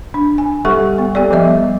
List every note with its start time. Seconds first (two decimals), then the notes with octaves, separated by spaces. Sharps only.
0.14 D4
0.38 G#5
0.65 G3 G4 A4 F#5 C#6
0.98 B3
1.15 B3 G4 A4 D5
1.31 F3 G3 B3 D#5 E5